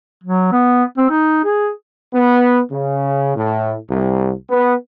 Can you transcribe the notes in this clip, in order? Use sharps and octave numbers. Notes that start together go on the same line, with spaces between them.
F#3
B3
C4
D#4
G#4
B3
C#3
A2
C2
B3